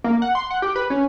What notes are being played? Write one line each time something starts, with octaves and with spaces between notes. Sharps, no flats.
A#3
F#5
C6
F#5
G4
B4
C#4